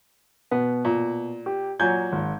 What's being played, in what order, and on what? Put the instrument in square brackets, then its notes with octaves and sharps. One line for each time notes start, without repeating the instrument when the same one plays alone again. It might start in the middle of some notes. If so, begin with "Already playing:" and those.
[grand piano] B2 [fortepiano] B3
[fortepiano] A#2
[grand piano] G4
[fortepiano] A#2 F#3 [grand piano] G#5 G6 G#6
[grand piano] G#1